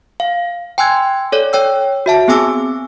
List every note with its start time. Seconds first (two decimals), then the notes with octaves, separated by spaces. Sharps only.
0.20 F5
0.78 G5 G#5 C6 E6 F#6 G#6
1.32 A4 C#5 D5
1.53 C#5 G5 E6
2.06 F#4 E5 A5
2.28 B3 C4 G#4 G#5 D6 E6